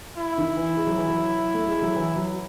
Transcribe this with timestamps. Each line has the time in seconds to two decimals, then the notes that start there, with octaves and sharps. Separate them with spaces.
0.17 E4
0.38 D#3
0.57 E3
0.77 G#3
0.87 F#3
0.97 E3
1.07 F#3
1.54 A3
1.68 G#3
1.82 F#3
1.96 E3
2.16 F#3